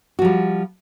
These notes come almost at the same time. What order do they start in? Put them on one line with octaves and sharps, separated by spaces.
F#4 F3 G3